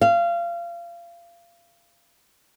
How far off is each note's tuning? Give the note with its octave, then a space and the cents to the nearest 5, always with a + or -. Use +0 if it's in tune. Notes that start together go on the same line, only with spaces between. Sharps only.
F5 -25